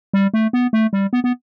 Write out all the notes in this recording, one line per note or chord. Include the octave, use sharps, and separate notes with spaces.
G3
A3
B3
A3
G3
B3
B3